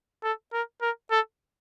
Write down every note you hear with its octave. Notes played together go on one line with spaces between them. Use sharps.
A4
A#4
A#4
A4